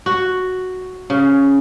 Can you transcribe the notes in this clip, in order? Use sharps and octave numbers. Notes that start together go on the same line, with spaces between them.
F#4
C#3